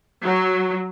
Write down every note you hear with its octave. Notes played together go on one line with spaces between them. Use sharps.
F#3